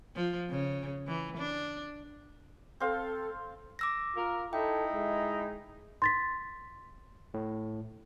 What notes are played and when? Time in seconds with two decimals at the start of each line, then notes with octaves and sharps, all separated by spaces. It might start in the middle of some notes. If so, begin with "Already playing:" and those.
0.16 F3
0.50 C#3
1.07 E3
1.37 D4
2.80 C4 A4 F5
3.79 D6 E6 A#6
4.16 F4 A#4
4.53 D#4 E4 A4 G5
4.92 G#3
6.02 C6 A6 B6
7.34 A2